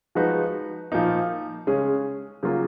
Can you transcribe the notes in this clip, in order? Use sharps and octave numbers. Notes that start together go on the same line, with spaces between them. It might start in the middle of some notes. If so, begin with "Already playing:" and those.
F3 G#3 D#4 F#4 B4
A#2 F3 A#3 D#4
C#3 G#3 C#4 G#4
C#3 F#3 A#3 F4 G#4